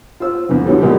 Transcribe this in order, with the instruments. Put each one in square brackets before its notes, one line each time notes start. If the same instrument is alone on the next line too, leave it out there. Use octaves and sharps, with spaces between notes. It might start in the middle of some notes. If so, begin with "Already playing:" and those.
[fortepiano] F4 C5 E6
F2 D3 E3
D3 E3 F#3 G3 A4
A#1 A#2 G#3 A#3 B3 G4